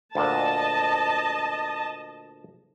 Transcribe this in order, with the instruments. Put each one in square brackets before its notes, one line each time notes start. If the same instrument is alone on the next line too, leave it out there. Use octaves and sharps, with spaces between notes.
[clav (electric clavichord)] D2 A#2 D4 [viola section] D#5 A5